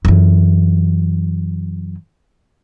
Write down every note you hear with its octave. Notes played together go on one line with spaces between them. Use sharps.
F#2 E3